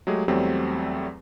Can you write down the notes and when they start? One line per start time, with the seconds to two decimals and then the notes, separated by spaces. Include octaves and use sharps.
0.07 F#3 G#3 A3 G4 G#4
0.28 E2 F#3 G3 A3 C4